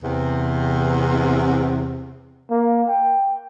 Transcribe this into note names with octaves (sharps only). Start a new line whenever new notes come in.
E2 C3
A#3
G5